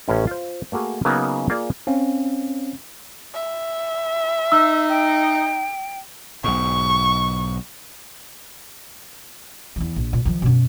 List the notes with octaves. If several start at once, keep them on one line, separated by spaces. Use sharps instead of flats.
A1 A2 C#4
F4 C5
A3 A#3 F#4 G#4
C#3 F#3 A#3 B3 D#4 A#4
A#3 F4 G#4 D5
C4 C#4 F5
E5
D#4 E6
G5
B1 G#2 C#6
E2 E3
A#1
A#2
D#3 F3
F#2 B2